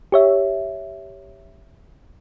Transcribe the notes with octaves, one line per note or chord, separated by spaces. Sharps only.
G4 C#5 E5